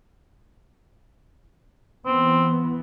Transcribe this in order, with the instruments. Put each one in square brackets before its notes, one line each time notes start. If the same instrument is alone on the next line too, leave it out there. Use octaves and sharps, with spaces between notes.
[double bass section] E3 B3 [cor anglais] C4